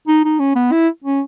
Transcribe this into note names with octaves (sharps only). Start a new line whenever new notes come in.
D#4
D#4
C#4
B3
E4
C#4